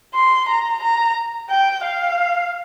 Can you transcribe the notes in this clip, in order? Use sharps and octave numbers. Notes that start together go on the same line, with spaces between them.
C6
A#5
A#5
G5
F5